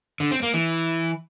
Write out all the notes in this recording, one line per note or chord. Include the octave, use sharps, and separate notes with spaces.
D3
C4
A#3
E3